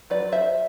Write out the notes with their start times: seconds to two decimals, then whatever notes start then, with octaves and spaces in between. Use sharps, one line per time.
0.10 F#3 B4 D5
0.32 C5 E5